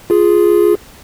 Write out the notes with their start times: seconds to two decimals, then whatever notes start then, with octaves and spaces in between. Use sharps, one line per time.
0.10 F4 G#4